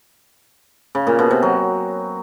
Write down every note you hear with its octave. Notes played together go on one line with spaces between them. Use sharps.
C#3
A#2
B2
C3
F#3